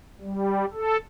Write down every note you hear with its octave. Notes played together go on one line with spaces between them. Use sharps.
G3
A4